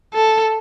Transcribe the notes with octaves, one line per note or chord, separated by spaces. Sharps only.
A4